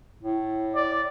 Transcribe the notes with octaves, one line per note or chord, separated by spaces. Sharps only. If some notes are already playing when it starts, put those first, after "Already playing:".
A2
D5